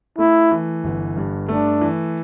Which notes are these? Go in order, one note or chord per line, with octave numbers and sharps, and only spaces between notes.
A3 E4
E3
G1
G2
A3 D4
E3